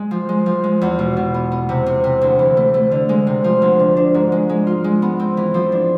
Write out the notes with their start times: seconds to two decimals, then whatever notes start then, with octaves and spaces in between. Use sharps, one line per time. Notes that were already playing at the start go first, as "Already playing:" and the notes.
Already playing: G#3
0.11 F3
0.29 G#3
0.46 F3
0.64 G#3
0.81 E2
0.99 B2
1.17 B2
1.34 B3
1.52 B3
1.69 C3
1.86 C3
2.04 C3
2.22 D2
2.39 E3
2.57 A3
2.74 A3
2.91 D3
3.09 G#3
3.27 C3
3.44 F3
3.62 D2
3.79 D4
3.97 D4
4.14 G#2
4.32 G#3
4.49 G#3
4.67 F4
4.84 G#3
5.02 B3
5.19 C4
5.37 E3
5.54 F3
5.72 D4